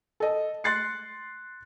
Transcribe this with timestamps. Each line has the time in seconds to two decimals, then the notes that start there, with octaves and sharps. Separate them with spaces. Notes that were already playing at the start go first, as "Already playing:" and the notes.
0.20 A4 D#5
0.64 C6 F#6 A6 C7 C#7